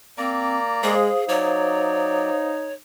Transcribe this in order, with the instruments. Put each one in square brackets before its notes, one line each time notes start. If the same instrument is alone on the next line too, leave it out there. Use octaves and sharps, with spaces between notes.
[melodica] A#3 D5 A#5 [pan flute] C4
[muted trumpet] G#3 [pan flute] G#4 [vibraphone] C5 F5 D#6
[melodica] F#3 D5 [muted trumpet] D#4 [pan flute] C#5